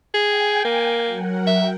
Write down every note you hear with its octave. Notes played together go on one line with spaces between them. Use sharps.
G#4 G5 G#5
A#3
F#3 A#4 F#5
E5 G5